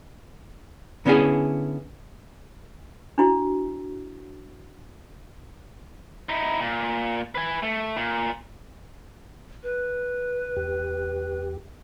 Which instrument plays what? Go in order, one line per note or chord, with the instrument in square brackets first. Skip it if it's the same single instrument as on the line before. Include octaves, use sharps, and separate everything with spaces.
[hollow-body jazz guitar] D3 B3 C#4 E4 G#4
[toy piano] D4 E4 F#4
[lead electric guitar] D#4 E4
A#2
B4 G#5
A3
A#2
[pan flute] B4
[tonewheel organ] E2 G4